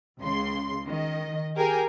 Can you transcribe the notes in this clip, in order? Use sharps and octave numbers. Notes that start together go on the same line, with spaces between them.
C#2 C#3 C6
D#3 D#5
G4 G#4 A#4 G5 G#5